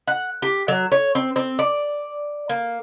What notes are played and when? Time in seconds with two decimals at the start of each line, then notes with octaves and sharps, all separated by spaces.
0.08 F#5
0.42 G4
0.68 F#3
0.92 C#5
1.15 C4
1.36 C4
1.59 D5
2.49 A#3